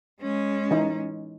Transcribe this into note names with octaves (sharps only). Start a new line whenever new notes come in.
G#3 C#4
E3 D#4